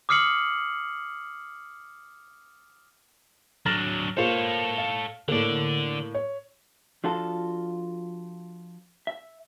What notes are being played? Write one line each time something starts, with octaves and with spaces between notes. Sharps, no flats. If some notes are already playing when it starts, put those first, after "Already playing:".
D6 D#6 F6 C7 C#7 F#7
F#3 D4 F6 A6 A#6
A#3 F4 A4 C5 C#5
F5
A2 D3 A#3 D5
C#5
F3 D4 F4 F#4 A4
E5